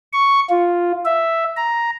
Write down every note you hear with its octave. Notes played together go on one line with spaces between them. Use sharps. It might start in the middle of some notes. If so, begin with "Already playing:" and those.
C#6
F4
E5
A#5